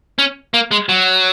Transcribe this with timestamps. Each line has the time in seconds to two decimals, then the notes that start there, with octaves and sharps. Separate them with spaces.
0.19 C#4
0.54 A#3
0.71 G#3
0.89 F#3